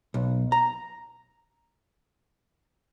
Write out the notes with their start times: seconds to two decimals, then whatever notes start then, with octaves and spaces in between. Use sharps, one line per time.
0.14 B1
0.52 A#5